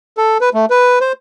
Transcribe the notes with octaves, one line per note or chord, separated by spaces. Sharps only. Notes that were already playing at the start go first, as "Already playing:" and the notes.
A4
B4
A3
B4
C5